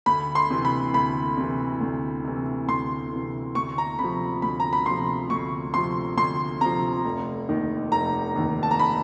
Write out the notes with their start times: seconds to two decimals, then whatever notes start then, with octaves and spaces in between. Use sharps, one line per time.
0.06 D2 B5
0.35 C6
0.50 C3 E3
0.65 B5
0.93 D2 B5
1.37 C3 E3
1.81 D2
2.24 C3 E3
2.68 D2 C6
3.12 C3 E3
3.55 D2 C#6
3.78 A#5
3.99 C3 F3 B5
4.42 D2 B5
4.60 A#5
4.73 B5
4.86 C3 F3 C6
5.30 D2 C#6
5.73 C3 F3 C6
6.17 D2 C6
6.61 C3 F3 A#5
7.05 F1
7.49 D#2 D#3
7.91 F1 A#5
8.36 D#2 D#3
8.63 A5
8.71 A#5
8.79 B5